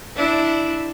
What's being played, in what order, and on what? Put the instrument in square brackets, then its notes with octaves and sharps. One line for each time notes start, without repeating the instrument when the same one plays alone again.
[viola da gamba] D4 E4